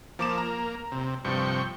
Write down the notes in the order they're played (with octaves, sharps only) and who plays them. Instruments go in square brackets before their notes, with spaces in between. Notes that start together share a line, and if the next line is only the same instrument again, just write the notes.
[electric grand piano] F3 D6 E7 [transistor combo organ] A#3
[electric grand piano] A#5
[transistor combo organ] C3
[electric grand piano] G2 F3 [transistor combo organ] C3 G5 C#6